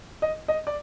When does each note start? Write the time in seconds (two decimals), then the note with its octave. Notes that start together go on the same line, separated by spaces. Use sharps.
0.22 D#5
0.48 D#5
0.67 D5